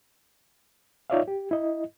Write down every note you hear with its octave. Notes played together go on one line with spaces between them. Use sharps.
D#4 F4 C#5 D5 E5 F5
G4
E4 D#5